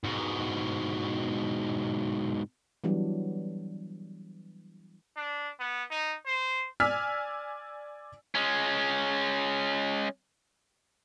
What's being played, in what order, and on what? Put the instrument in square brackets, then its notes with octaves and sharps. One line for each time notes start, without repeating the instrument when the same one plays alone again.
[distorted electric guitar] G#2 B2
[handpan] E3 F#3 G3 B3 D4
[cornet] D4
B3
D#4
C5
[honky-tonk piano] D5 G#5 E6 F6 B6
[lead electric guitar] G#3 C#4